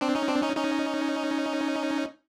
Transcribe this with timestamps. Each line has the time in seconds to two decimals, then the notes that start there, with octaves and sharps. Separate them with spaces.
0.01 C4 D4
0.15 C#4 D#4
0.28 C4 D4
0.42 C#4 D#4
0.57 C#4 D#4